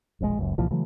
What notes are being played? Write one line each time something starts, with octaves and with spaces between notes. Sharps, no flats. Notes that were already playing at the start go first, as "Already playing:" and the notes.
E1 A#1 A2 G#3
F#1 C#2 F#2
C2 A#2 E3 F3
C#3 E3 F#3 A3